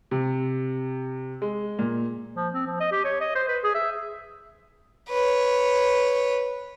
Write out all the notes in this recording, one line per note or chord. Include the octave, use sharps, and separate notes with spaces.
C3
G#3
A#2
F3
C4
F3
D#5
G4
C#5
D#5
C5
B4
G#4
E5
B4 C#5